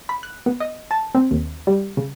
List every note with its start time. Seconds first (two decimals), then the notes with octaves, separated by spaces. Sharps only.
0.09 B5
0.23 F#6
0.46 B3
0.60 D#5
0.91 A5
1.15 C4
1.31 D#2
1.67 G3
1.97 C#3